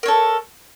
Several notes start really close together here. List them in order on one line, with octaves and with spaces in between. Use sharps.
A#4 C#5 A4